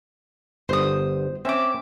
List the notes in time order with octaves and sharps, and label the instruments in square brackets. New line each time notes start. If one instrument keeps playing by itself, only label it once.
[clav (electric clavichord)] G1 [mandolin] C5 D#6
[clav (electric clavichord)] C4 C#4 [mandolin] E5 D6